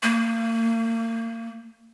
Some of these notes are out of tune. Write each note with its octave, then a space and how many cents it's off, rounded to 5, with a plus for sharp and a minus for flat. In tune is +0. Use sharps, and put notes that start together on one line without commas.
A#3 -40